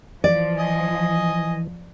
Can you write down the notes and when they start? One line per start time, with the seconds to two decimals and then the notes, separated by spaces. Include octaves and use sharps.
0.24 E3 F3 D5
0.58 D#5 G#5